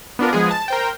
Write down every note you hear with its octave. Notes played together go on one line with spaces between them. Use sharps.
B3 D4 F4 A#4
F3 G#3 B3 G#4
A5
A#4 C5 G5